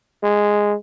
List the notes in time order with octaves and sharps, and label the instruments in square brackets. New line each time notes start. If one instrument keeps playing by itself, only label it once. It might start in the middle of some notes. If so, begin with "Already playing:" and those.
[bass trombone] G#3